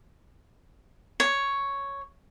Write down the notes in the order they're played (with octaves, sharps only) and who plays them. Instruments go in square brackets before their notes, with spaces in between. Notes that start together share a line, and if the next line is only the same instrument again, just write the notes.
[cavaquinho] C#5